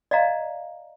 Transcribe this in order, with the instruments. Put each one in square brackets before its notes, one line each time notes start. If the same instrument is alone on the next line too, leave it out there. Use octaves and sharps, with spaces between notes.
[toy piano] D5 D#5 F5 A#5